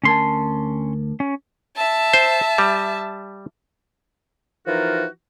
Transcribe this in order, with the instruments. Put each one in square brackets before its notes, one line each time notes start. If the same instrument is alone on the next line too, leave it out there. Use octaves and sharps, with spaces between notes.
[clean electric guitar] D2 A#4 A5 [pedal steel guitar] C#4 C6
[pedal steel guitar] C#4
[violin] E5 A5
[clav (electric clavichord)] C5
G3
[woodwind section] E3 F3 D#4 F4 F#4 A#4